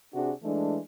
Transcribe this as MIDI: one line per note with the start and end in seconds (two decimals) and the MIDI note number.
0.14 0.32 48
0.14 0.32 62
0.14 0.32 66
0.14 0.32 68
0.44 0.79 52
0.44 0.79 56
0.44 0.79 57
0.44 0.79 62